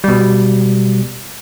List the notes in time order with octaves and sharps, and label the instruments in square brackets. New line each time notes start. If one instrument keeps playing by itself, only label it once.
[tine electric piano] B2 G3